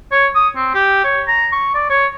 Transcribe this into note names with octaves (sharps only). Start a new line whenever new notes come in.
C#5
D#6
C4
G4
C#5
A#5
C#6
D5
C#5